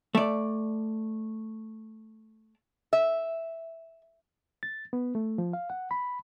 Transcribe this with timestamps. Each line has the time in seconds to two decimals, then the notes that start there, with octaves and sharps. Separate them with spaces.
0.15 A3 D5
2.93 E5
4.63 A6
4.93 B3
5.15 A3
5.38 F3
5.53 F5
5.70 F#5
5.91 B5